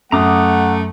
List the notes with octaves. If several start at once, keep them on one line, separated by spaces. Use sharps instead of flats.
F#2 A3 F#5 A#5 D6 D#6